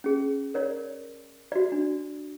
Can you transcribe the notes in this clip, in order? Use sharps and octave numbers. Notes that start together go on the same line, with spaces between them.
C#4 G#4
A#4 C#5 D5
F#4 D5
D4